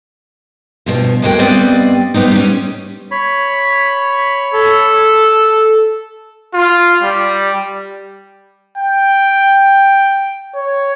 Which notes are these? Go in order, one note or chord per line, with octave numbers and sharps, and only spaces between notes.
G2 B2 F3
D2 G#3 A#3 F#4 G5
G2 G3 B3 C4 D5 D#5
G3 B3 C4 D#4
G3 C#4
C#5 B5
A4
F4
G3
G5
C#5